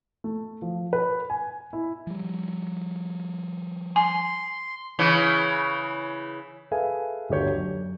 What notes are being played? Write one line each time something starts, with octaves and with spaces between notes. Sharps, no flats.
A3
F3
B4
G#5
E4
F3 G3
G#5 C6
C#3 E3
G#4 A4 B4 E5 F5 G#5
G1 D2 D3 G4 C#5 G6
F#2